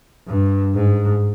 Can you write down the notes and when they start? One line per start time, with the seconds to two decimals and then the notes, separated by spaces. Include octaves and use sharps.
0.28 G2
0.75 G#2